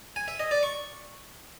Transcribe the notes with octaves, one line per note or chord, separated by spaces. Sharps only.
G#5
E5
D#5
D5
C#6